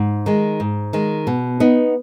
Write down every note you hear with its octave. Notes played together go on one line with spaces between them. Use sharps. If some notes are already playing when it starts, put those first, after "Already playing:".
Already playing: G#2
D#3 G#3
G#2
D#3 G#3
B2
B3 D#4